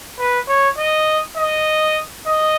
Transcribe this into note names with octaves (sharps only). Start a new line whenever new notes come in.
B4
C#5
D#5
D#5
D#5